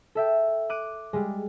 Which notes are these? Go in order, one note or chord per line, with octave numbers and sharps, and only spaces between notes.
A4 E5 G5
D6 F#6 D7 D#7
G3 G#3